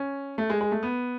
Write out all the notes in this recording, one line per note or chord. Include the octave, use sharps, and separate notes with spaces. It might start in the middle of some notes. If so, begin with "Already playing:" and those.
Already playing: C#4
A3
G#3
G#3
A3
B3